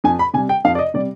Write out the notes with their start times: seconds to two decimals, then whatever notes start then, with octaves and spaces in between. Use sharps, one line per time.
0.04 F2 G#5
0.19 B5
0.34 C3 G#5
0.37 G3
0.49 G5
0.64 F2 F5
0.75 D5
0.79 D#5
0.94 C3 G3 D5